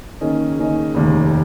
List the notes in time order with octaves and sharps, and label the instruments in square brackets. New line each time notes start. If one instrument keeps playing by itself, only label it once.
[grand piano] D#3 A#3 C#4 G#4 D#5
D#3 A#3 C#4 G#4 D#5
F1 D#2 D#3